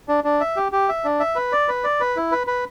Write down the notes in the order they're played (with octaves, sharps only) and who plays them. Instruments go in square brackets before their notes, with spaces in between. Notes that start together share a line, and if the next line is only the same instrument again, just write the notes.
[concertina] D4
D4
E5
G4
G4
E5
D4
E5
B4
D5
B4
D5
B4
E4
B4
B4